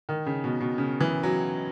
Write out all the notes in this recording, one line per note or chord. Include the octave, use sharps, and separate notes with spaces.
D#3
C#3
B2
B2
C#3
E3
F#3